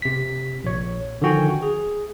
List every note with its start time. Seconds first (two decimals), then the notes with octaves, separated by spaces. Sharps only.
0.02 C3 B6
0.64 A#1 C#5
1.22 D3 D#3 F3 F#4 G5 G#5
1.62 G#4